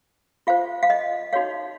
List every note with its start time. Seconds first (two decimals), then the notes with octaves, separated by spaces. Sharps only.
0.47 F4 C5 F5
0.83 F5
0.90 D#5
1.33 D#4 F#4 C#5 F5